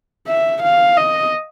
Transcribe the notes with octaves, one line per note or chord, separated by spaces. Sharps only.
E5
F5
D#5